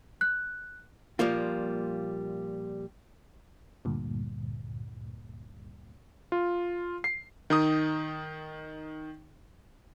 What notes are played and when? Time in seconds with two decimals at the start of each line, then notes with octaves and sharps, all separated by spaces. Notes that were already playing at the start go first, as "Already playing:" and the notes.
0.21 F#6
1.19 A#2 F3 G3 A#3 F4
3.85 D2 G2 A#2
6.32 F4
7.04 C7
7.50 D#3 D#4 D#6